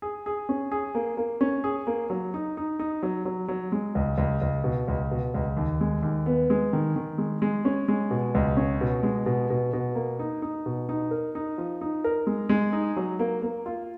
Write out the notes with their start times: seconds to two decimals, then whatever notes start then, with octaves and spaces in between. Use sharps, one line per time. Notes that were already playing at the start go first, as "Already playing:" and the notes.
0.02 G#4
0.26 G#4
0.49 C#4
0.72 G#4
0.95 A#3
1.17 A#3
1.41 C#4
1.64 G#4
1.87 A#3
2.10 F#3
2.34 D#4
2.57 D#4
2.79 D#4
3.03 F#3
3.25 F#3
3.48 F#3
3.72 G#3
3.95 C#2
4.18 C#2
4.42 C#2
4.64 B2
4.88 C#2
5.11 B2
5.34 C#2
5.57 D#2
5.81 G#3
6.03 D#2
6.26 B3
6.50 G#3
6.73 D#3
6.96 D#3
7.18 G#3
7.42 G#3
7.65 C#4
7.88 G#3
8.11 B2
8.35 C#2
8.57 C#4
8.81 B2
9.03 G#3
9.26 B2
9.50 B2
9.73 B2
9.95 A#3
10.19 D#4
10.42 D#4
10.66 B2
10.89 D#4
11.11 A#4
11.35 D#4
11.58 F3
11.81 D#4
12.04 A#4
12.27 G#3
12.49 G#3
12.73 D#4
12.97 F#3
13.19 A#3
13.42 A#3
13.66 F4